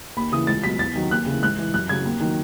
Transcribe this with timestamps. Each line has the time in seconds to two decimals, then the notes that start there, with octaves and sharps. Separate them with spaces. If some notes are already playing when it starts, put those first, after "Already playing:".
0.17 D#2 B5
0.32 C#3 E3 D#6
0.47 C#2 A6
0.64 B2 F#3 B6
0.79 E2 A6
0.96 D#3 F#3
1.10 D#2 F#6
1.26 C#3 E3
1.43 G#2 F#6
1.59 E3
1.74 F#2 F#6
1.89 C#3 F#3 G#6
2.05 D#2
2.20 D#3 F#3